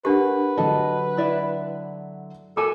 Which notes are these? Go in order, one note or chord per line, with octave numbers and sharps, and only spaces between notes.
D4 G4 A#4 B4 F#5
D3 F#3 A4 D#5
E4 D5 E5
F#4 A4 A#4 G#5 D6